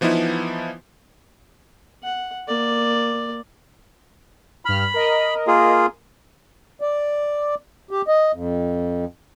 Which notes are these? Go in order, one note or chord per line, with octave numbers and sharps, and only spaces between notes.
E3 F3 B3 D#4 E4
F#5
A#3 D5
G2 B5 F6
A#4 D#5
A#3 F4 G#4
D5
G4
D#5
F2